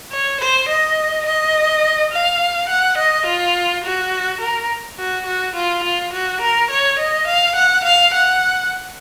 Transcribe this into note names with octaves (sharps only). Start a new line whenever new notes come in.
C#5
C5
D#5
D#5
F5
F#5
D#5
F4
F#4
A#4
F#4
F#4
F4
F4
F#4
A#4
C#5
D#5
F5
F#5
F5
F#5